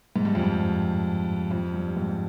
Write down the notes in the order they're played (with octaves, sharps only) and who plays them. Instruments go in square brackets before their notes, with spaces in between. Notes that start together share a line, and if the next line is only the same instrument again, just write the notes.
[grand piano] G#2
G2
F2
G2
F2
G2
G#2